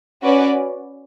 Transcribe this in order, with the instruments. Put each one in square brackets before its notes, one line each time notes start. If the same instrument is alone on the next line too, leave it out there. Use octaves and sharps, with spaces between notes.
[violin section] C#4 F#4 B4 D5